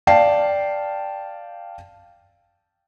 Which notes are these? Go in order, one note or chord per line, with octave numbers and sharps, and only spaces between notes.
D5 F5 G5 A5 C7